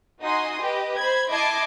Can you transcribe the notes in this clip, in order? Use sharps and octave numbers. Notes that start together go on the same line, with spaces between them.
D#4 F#4 D#5 G#5 C6 D#6
G4 B4 D#5
C5 B5 G#6
E4 D#5 A5 D6 G#6 C7